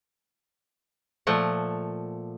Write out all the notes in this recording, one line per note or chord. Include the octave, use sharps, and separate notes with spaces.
A#2 F3 A3 F#5